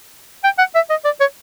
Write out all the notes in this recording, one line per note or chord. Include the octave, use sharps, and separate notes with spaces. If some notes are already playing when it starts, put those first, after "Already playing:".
G5
F#5
E5
D#5
D5
C#5